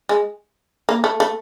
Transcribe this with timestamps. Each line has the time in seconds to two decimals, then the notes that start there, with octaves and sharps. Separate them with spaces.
0.09 G#3
0.89 A#3
1.04 A3
1.20 A3